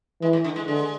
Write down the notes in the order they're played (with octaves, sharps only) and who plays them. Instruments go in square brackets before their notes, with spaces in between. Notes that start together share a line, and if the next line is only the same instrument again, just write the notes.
[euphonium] E3 [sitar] G#3
[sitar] A2
D3
G#3
[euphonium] D3 [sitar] G#3